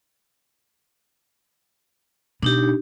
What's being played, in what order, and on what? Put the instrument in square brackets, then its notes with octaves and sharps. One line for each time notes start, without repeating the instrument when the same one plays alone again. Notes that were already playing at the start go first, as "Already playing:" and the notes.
[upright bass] B2 [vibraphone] D4 D#4 G4